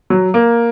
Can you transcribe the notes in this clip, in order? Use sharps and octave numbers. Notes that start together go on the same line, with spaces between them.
F#3
A#3